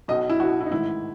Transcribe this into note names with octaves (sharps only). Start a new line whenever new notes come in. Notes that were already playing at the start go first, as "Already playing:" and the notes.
B1 B2 D#5
E4
B1 B2 F#4
E4
D#4
A1 G#2 D#3 E4